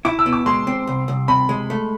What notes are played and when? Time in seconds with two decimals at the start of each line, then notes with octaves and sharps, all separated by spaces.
0.05 E4 D6
0.19 E6
0.26 B2
0.33 D6
0.46 G#3 C6
0.67 C4
0.87 C2
1.08 C2
1.28 C3 B5
1.49 G#3
1.70 A3